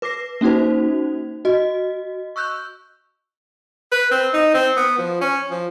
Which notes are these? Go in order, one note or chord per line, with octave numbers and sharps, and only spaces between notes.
B4 D6 A#6 C7
A#3 C#4 D#4 F#4 C5
F#4 D#5
C#6 E6 F#6 G6
B4
C4
D#4
C4
B3
F3
C#4
F3